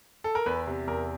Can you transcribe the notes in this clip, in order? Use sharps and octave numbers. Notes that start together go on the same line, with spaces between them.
A4
A#4
E2 B4
C3
E2 A#4